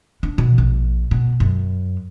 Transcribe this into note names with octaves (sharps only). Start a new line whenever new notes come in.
D4
B2
A#1
B2
F#2